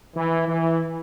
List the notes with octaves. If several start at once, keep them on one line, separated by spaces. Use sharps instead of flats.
E3
E3